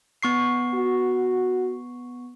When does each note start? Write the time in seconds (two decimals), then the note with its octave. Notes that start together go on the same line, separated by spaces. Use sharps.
0.23 B3 C#6 C7
0.75 F#4